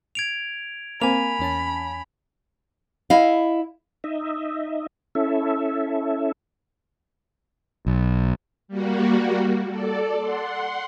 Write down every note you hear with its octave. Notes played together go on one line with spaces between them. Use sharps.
G#6 D7 F7
A#3 C4 G#5 B5 F7
E2 C#4 A5
E4 D#5 F5
D#4 D#5 E5
C#4 E4 A4 E5
B1
G3 A#3 F#4
A4 D5
F#5 C6